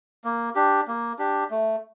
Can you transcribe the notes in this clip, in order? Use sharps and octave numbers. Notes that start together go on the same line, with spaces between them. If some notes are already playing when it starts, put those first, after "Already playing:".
A#3
D4 G4
A#3
D4 G4
A3